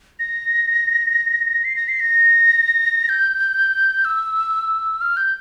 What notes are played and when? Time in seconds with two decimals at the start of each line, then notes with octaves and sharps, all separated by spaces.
0.19 A#6
1.64 C7
1.76 A#6
1.88 C7
2.00 A#6
3.09 G6
4.05 E6
5.01 F6
5.17 G6